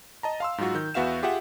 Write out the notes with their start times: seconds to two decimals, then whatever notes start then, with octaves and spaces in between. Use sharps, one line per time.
0.23 D#5 A5 A#5
0.40 F5 C6 E6
0.58 G#2 F#3 F4 F#4
0.75 D#3 G6
0.94 E2 B3 F#4 E5 F5 E7
1.22 F4 G4 G#4 E5 F#5